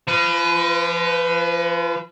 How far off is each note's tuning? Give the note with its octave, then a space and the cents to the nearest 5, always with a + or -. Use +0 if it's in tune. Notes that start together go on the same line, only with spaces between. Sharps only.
F3 -30 B4 +15